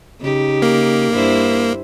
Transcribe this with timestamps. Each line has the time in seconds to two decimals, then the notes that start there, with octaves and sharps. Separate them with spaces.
0.21 C#3 D#4 G4
0.62 A#3
1.13 G2 E4 C5